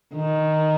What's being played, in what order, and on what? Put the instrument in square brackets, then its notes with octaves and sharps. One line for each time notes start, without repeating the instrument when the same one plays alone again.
[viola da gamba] D#3